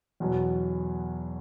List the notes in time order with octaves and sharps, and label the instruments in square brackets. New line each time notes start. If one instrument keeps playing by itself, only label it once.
[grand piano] E2 B2 F#3